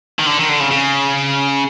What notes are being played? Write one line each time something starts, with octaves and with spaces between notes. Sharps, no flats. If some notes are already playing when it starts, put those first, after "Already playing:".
D#3
D3
D#3
D3
C#3
C#3